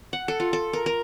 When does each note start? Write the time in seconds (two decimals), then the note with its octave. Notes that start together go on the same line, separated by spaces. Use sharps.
0.13 F#5
0.28 A4
0.40 F4
0.53 A4
0.73 A#4
0.86 A#4